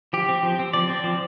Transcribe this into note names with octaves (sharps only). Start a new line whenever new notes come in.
F3 G4
C4
F3
C4
F3 D5
C4
F3